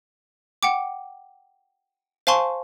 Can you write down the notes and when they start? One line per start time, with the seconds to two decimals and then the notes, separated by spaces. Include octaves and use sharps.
0.63 F#5 G5 D6
2.27 C5 F5 G#5 A5 C6 C#6